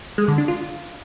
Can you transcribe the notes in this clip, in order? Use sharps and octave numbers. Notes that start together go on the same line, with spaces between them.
G#3
D3
D4
F4